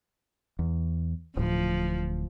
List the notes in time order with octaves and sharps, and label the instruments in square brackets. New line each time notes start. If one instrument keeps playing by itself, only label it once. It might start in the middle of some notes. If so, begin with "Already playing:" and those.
[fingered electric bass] E2
[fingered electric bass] D1 A2 [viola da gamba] F3